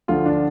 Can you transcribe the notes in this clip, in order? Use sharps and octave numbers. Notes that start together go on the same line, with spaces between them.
D2 D3 F3 F4
D4